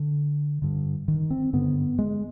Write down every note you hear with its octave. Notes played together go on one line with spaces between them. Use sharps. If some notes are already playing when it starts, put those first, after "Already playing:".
Already playing: D3
G2 D3
D#3
C4
G2 D3 B3
G#3